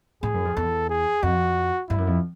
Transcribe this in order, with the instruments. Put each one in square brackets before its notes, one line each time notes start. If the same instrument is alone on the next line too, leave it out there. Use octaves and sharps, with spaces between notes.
[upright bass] A2 [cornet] G#4
[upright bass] F#2
F2
[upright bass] E2 [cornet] A4
[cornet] G#4
[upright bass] F2 [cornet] F#4
[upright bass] G2 [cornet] E4
[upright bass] F#2
F2